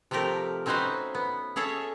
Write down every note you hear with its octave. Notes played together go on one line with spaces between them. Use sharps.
C3 F3 A3 G4 A#4
C4 C#4 D#4 F#4 B4 C5
B3
C#4 G#4 A4 C#5 E5